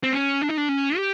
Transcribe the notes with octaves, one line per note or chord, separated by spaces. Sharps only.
C4
C#4
D4
D#4
D4
C#4
G4